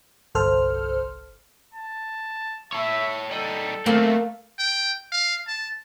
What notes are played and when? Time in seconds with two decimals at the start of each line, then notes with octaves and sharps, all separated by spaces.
0.35 G1 C2 A4 C5 F6
1.74 A5
2.73 A4 C#5 E5
3.31 G3 D#4 A4
3.86 F#2 A3 A#3 C4
4.59 G5
5.12 F5
5.48 A5